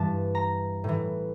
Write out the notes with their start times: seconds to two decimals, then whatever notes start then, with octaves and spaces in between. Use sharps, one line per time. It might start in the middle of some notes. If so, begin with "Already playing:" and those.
Already playing: G2 E3 A5
0.35 A#5
0.84 A2 E3